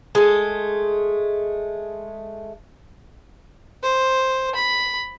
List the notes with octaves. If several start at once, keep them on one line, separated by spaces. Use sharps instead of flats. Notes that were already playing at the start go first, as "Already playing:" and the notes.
G#3 A3
C5
B5